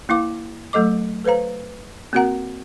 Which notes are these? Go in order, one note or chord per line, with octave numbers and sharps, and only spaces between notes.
A#3 E4 F5 D6
F#3 A3 A4 D#5 D6
A4 B4 C5 F5 A#5
A#3 C4 F#4 A#4 F#5 A#5